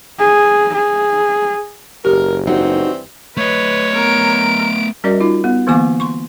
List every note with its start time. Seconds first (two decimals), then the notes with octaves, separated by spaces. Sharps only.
0.20 G#4
0.75 G#4
2.05 F#1 G4 A#4
2.47 G2 E3 C4 D#4 F#4
3.37 A3 B4 C#5 D#5
3.95 B3 A#4 D7
5.04 G3 C#4 F#4 A#4 D5 D#5
5.20 D#4 F4
5.44 B3
5.67 D3 E3 A#3 B3 G#5 D6
6.00 C6 C#6